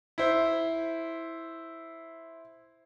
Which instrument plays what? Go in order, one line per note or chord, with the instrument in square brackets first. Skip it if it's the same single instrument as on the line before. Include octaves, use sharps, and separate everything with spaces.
[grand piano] E4 C5